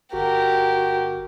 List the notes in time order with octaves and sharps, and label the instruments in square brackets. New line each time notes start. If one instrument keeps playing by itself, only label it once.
[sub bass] G1 [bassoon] F#4 [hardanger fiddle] G4 A#4